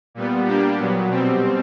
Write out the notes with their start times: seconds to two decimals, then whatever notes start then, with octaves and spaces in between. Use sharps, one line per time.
0.15 A#2 G3 B3
0.46 G3 A#3 D4 G4
0.77 A#2 F#3 B3
1.08 B2 G3 C4